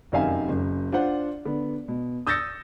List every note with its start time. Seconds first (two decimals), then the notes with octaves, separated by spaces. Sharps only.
0.12 F1 F#2 D#3 E5 F5 G#5
0.48 F#1 F#2
0.92 D4 F4 C5 F#5
1.45 D3 B3
1.88 B2
2.27 D#6 E6 G6 A6 A#6 C#7